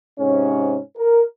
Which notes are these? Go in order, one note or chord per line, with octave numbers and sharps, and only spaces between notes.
G#2 C3 C#4
A#4